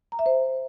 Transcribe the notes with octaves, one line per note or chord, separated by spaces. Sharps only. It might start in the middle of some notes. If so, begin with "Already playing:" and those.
A#5
E5
C5